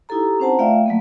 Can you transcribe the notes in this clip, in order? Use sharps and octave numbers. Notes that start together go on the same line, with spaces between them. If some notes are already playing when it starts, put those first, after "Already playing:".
D#4 E4 G4 A4 A#5
C4 C#4 C5 F#5 A5 A#5
A3 F4 D5 E5 F5 G5
F#3 A3 A#3